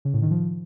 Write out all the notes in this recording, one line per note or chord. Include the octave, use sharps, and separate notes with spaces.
C#3
A2
D#3
F3